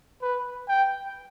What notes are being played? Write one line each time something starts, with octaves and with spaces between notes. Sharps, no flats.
B4
G5